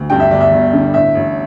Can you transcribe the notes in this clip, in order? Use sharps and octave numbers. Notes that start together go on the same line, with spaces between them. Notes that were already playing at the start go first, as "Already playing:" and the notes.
Already playing: D2
G2 G5
E5
G1 D5
E5
G1
D3
A2 E5
A1